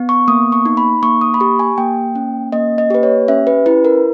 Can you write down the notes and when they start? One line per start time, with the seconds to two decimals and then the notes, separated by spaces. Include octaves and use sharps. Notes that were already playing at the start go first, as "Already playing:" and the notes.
Already playing: B3
0.09 C#6
0.28 A#3 D#6
0.52 C#6
0.65 D#4
0.77 B5
1.03 A#3 C#6
1.21 D#6
1.34 B5
1.40 G4 C#6
1.59 G#5
1.78 A#3 G5
2.15 C#4
2.52 A#3 D#5
2.78 D#5
2.90 G4 B4
3.03 C#5
3.28 C#4 E5
3.47 B4
3.66 E4 B4
3.85 A#4